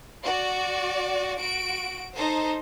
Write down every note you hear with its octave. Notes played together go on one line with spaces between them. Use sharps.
F#4 D5
F#4 D7
D#4 A4 C5